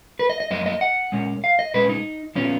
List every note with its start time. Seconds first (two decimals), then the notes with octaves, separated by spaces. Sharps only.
0.19 B4
0.30 D#5
0.40 D#5
0.51 F#2 F3 A#3 D#5
0.66 D#5
0.81 F#5
1.12 A#2 G#3 C#4
1.44 F5
1.59 D#5
1.74 A#2 G#3 C#4 B4
1.89 D#4
2.35 A#2 F3 B3 C#4